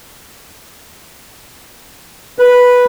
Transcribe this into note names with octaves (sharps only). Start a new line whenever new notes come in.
B4